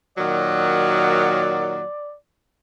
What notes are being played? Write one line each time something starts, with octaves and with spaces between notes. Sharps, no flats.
A#2 D#3 F#3 D5